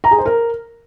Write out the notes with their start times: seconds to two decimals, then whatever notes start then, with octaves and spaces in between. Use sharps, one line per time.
0.04 A#5
0.11 G#4
0.18 C5
0.26 A#4